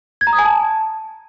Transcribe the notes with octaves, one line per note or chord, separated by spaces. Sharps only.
G#6
A#5
D#6
G#5
A5